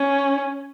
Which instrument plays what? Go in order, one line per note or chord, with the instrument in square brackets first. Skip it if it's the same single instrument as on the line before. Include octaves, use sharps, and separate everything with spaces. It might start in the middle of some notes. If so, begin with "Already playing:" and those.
Already playing: [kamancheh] C#4